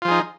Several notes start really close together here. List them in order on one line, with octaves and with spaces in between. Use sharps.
F4 F3 G#4 D#4